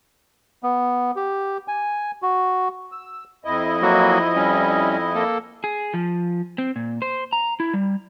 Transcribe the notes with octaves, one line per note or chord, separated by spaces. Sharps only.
B3
G4
G#5
F#4
E6
F2 E4 D#5
F#3 A#3 F#4
G3 C#4
A#3 A4
G#4
F3
C4
A#2
C5
A#5
E4
G3